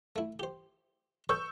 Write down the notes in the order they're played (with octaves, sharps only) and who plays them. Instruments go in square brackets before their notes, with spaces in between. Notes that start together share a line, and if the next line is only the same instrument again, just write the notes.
[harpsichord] A3 E4
G4 C5
[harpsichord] A4 B4 C#5 [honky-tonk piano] C#6 E6 G6